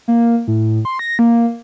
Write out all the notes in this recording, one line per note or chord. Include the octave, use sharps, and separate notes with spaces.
A#3
A2
C6
A#6
A#3